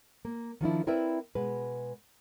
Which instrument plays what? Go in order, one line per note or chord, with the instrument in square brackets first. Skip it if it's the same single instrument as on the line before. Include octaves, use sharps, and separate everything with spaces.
[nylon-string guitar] A#3
D#3 F3 D4 E4
C4 E4 A#4 B4 D5 E5
B2 G#3 B4